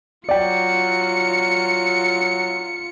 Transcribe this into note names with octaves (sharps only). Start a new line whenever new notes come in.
F#3 F4 D5 G5 C#7